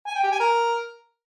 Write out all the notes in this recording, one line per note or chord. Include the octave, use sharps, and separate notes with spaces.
G#5
G5
G4
G#5
A#4